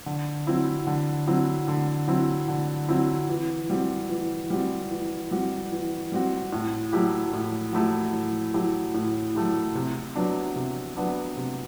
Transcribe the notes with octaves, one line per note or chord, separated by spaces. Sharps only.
D3
F#3 C4 E4
D3
F#3 C4 E4
D3
F#3 C4 E4
D3
F#3 C4 E4
E3
G3 C4 F#4
E3
G3 C4 F#4
E3
G3 C4 F#4
E3
G3 C4 F#4
A2
F#3 A3 E4 G4
A2
F#3 A3 E4 G4
A2
F#3 A3 E4 G4
A2
F#3 A3 E4 G4
C3
F#3 B3 D4
C3
F#3 B3 D4
C3